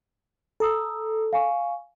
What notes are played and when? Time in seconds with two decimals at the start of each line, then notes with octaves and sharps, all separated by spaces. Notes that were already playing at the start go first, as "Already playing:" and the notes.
0.60 A4 A#5 D#6 E6
1.33 F5 G#5 C#6